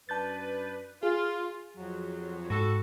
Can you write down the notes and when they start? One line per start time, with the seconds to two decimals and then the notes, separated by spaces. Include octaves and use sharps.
0.09 F#2 D4 B4 A5 G6 A6
1.03 F4 G#4
1.76 F2 F#3
2.50 G#2 F#4 A4